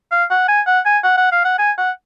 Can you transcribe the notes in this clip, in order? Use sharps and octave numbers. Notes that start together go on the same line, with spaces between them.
F5
F#5
G#5
F#5
G#5
F#5
F#5
F5
F#5
G#5
F#5